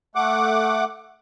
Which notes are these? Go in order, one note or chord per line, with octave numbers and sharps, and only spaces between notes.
A3 F#5 D6